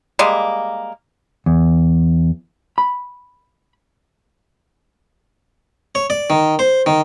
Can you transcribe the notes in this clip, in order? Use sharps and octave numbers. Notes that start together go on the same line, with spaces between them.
G3 G#3 A#3
E2
B5
C#5
D5
D#3
C5
D#3